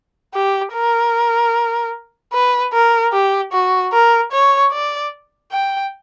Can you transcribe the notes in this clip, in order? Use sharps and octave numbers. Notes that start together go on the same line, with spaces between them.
G4
A#4
B4
A#4
G4
F#4
A#4
C#5
D5
G5